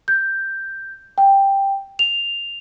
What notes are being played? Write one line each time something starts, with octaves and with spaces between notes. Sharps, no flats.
G6
G5
F7